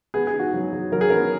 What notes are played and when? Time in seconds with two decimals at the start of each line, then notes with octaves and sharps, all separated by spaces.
0.14 B3 G#4
0.27 G#4
0.34 D#4
0.39 F#4
0.53 F#3
0.73 F#3
0.92 F#3 A#4
1.01 G#4
1.10 B3 A#4